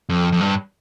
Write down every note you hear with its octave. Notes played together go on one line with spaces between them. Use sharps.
F2
F2
G2